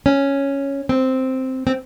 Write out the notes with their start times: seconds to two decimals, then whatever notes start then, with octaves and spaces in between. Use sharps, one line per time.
0.06 C#4
0.89 C4
1.67 C4